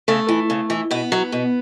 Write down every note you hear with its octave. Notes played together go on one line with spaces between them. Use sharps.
C#3 A3
E3
C#3
E3
B2 B3
F#3
B2